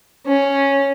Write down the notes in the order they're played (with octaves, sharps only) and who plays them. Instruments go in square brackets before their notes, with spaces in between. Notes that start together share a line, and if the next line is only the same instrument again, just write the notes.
[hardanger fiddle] C#4